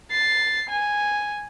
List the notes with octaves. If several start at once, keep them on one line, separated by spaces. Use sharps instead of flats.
A6 C7
G#5